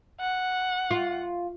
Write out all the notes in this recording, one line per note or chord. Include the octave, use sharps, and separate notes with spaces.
F#5
F4